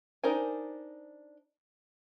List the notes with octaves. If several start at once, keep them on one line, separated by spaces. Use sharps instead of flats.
D4 D#4 A#4 C5 G#5